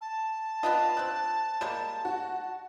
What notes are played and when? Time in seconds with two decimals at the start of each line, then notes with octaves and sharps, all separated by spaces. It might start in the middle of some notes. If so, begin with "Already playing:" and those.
0.01 A5
0.63 B3 D4 F4 D#5
0.97 C4 D4 F#6
1.61 G3 G#3 A#3 E7
2.05 F#4